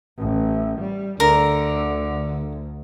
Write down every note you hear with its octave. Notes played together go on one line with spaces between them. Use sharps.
A1
G3
D2 D3 A#4